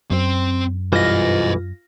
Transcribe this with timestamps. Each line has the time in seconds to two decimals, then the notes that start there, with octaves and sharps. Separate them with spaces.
0.11 F#2 C4 C5
0.92 B1 G2 E3 F4 C5 D#5 A#6